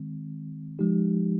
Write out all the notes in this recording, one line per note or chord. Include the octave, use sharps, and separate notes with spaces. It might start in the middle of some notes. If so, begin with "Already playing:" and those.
Already playing: D#3 G#3 C4
F3 G#3 D#4 G4